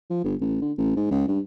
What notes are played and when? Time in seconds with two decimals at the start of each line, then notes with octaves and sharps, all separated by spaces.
0.10 F3
0.24 G1
0.41 A1
0.61 D3
0.78 A1
0.96 G#2
1.11 C#2
1.28 G2